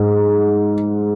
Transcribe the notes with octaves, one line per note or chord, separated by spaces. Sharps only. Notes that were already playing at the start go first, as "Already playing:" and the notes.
Already playing: G#2